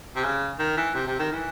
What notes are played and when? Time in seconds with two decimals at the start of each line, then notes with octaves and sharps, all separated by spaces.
0.16 C3
0.23 C#3
0.59 D#3
0.77 E3
0.95 C3
1.07 C3
1.19 D#3
1.32 E3